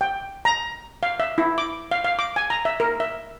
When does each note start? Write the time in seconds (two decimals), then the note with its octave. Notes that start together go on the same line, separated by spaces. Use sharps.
0.01 G5
0.45 A#5
1.03 F5
1.20 E5
1.38 E4
1.58 D6
1.91 F5
2.04 F5
2.19 D6
2.36 G#5
2.50 A#5
2.65 E5
2.80 A#4
3.00 E5